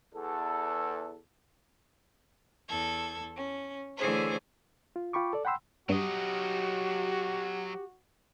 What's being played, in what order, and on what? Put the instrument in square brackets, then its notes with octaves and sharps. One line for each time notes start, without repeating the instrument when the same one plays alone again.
[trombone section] E2 A4
[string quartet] E2 A4 G#6
C#4
D3 E3 A3 G#4 C5 C#5
[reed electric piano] F4
F4 G5 B5 C#6 D6
A4 D5
F#5 G5 B5 C6 E6
[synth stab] G2 [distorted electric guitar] F#3 D#5 [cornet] F#4 [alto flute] G4